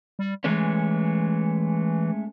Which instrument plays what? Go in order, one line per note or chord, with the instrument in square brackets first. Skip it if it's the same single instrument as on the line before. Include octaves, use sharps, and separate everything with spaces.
[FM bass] G3
[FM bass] E3 [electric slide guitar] G#3 A3 C#4